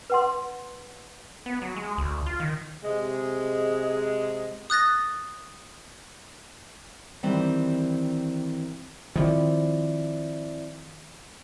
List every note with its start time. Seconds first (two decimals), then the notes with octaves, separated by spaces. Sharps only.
0.10 B4 F#5 C6
1.46 B3
1.62 F#3
1.76 G#3
1.98 D2
2.26 F4
2.40 D#3
2.82 C3 G#3
4.70 D#6 F#6 A6 A#6
7.23 D#3 E3 G3 C4 D5
9.16 D#3 F3 C4 E4 D5